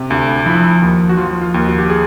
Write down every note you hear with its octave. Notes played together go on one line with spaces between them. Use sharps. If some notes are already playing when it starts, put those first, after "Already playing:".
Already playing: C3
D2
F3 E4
D#2
F#4
F3 F4
F4
D#2
F#4
G4
G#4